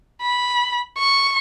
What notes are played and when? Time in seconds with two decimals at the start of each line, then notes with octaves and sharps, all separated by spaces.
0.22 B5
0.98 C#6